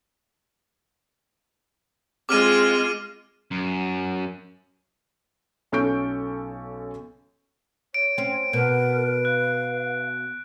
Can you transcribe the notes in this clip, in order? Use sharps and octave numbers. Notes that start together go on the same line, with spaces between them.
G#3 C4 F4 D6 F6 D#7
F#2
B1 C#4 A4 C#6 G6 D7
C#5 D7
C4 C#4
B2 A#4 B4
F5 F#6